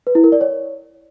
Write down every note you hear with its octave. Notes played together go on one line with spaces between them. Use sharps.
B4
E4
A#4
D5
C#5